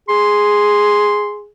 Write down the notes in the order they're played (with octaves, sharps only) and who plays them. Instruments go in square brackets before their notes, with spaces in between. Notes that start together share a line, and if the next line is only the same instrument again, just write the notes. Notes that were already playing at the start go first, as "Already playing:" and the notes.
[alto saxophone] G#4 [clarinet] C6